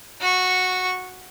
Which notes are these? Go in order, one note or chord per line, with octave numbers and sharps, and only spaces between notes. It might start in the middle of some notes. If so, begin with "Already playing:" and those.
F#4 C#6